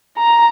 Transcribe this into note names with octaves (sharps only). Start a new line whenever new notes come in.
A#5